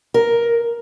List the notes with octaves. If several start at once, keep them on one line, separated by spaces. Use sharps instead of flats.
A#4